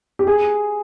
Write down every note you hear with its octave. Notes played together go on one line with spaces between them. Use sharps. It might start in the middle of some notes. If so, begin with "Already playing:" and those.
G4
G#4